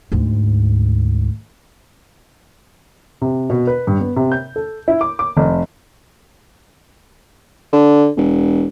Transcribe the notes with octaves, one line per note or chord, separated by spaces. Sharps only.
D2 G#2
C3
B2
B4
G2
B3
C3
G6
A4
E4
D6
D6
F1
D3
E1